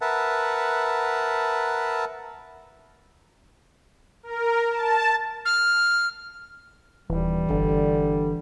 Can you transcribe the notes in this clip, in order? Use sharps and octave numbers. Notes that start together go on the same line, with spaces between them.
A#4 B4 E5 F#5 A5
A#4
A5
F6
D#1 E3 G3
G1 D3